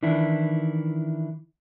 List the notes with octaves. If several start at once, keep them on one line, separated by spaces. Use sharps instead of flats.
D#3 E3 D4 E4